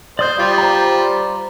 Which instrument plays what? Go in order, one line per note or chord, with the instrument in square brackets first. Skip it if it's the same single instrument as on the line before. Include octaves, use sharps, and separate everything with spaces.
[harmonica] C5 [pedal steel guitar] D5 D#6 G6
[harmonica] G3 F4
[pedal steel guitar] C5 A#5